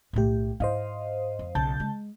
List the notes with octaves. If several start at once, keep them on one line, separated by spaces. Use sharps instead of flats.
B1 A2 A3 G4
G#2 E4 C5 D#5 F5
F2
B1 C#3 A5 G6
G#3